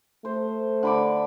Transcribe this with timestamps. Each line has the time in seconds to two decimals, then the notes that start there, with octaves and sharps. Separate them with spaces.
0.25 A3 C5
0.83 D3 B5 D6